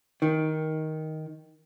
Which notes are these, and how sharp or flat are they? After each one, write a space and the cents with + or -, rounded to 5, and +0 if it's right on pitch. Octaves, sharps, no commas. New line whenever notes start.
D#3 +10